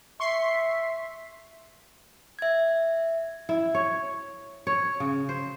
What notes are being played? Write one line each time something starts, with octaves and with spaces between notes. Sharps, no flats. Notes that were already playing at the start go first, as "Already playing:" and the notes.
E5 C6 C#6 C7
E5 G#6
E4
C#5
C#5
C#3
C5